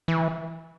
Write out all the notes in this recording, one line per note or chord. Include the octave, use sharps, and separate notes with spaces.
E3